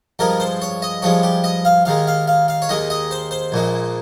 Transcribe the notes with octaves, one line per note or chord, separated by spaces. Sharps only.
G2 F3 G#3 A#4
C5
C#5
D#5
G2 F3 G#3 C#5
G4
D#5
F5
D#2 D#3 G#3 F5
F5
F5
F5
C#5
D#2 D#3 G#3 D#5
D#5
C5
C5
A#1 A#2 G#3